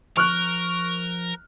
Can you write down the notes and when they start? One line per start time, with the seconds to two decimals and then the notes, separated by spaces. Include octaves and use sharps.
0.17 F3 A#4 C#6 F6 F#6